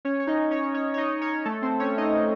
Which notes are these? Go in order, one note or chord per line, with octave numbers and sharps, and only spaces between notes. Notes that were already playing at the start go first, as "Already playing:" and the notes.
C#4 C#5
C#5
D#4 D#5
C#4 C#5
C#4 C#5
C#5
D#4 D#5
C#4 C#5
A3 A4
C4 C5
C#4 C#5
D#4 D#5